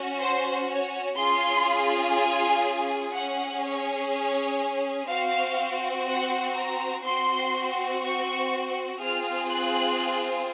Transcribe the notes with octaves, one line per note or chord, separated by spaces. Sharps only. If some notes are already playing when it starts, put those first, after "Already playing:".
Already playing: C#4 F#4
C5
C#5
C#4 F4 G#4 C6
G#5
C#4 G#4 F#5
C#5
C#5
C4 F#4 F5
F#5
A#5
C4 F#4 C6
C#6
C4 F4 G#4 F6
F#6